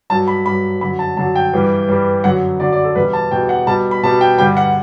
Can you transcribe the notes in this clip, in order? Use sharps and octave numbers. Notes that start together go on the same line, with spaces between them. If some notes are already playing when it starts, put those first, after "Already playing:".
G2 F#3 A5
B5
G2 F#3 B5
F#2 D3 F#3 B5
A5
F#2 D3 F#3 A5
G5
G2 E3 G3
G2 E3 G3
F#2 D3 F#3 F#5
F#2 D3 F#3 D5
D5
A4
E2 B2 G3 B4
A5
E2 B2 G3 G5
F#5
B2 G3 A5
B5
B2 G3 A5
G5
G2 D3 G3 G5
F#5